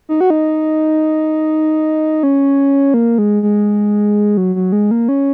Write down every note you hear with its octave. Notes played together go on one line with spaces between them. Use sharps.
D#4
F#4
D#4
C#4
A#3
G#3
G#3
F#3
F#3
G#3
A#3
C#4